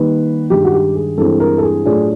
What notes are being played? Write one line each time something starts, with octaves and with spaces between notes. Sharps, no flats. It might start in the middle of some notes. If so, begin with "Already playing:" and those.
Already playing: D#3 G3 A#3 D#4 B4
G2 D#3 G#3 G4
F#4
G4
G#4
G2 E3 G#3 C4 E4 A4
A#4
A4
G#4
A2 F#3 A3 D4 F4 G#4